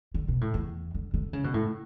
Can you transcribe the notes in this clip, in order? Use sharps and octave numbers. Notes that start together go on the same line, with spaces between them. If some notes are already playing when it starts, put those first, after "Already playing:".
D3
B2
A2
E2
D3
D3
C#3
B2
A2